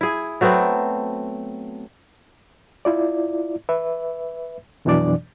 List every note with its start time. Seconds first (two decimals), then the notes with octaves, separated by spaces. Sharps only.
0.01 E4 G#4
0.41 F#3 A3 B3 C4
2.85 E4 F4 D5
3.69 B4 E5
4.85 F2 B2 E3 F#3 D4 D5